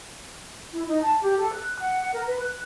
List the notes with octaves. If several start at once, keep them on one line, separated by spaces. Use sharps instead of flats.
E4
D#4
A5
G4
A4
F#6
F#5
A#4
B4
F#6